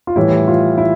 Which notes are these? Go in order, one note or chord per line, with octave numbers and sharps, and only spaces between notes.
F4
A2 E3 G3 E4
F4
E4